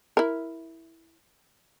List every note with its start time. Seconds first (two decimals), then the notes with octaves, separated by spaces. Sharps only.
0.17 E4 A#4